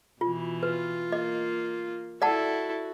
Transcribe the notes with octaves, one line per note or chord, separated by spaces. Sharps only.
B2 E3 F4
F4 B4
A#3 D#5
E4 F#4 A4 D5 F#5 A5